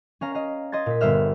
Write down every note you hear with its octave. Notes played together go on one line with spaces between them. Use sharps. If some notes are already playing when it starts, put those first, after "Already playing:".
C#4 F5 A#5
D#5 F5
D#5 C6 G#6 A6
A#2 B6
G1 B3 C5 E5 F6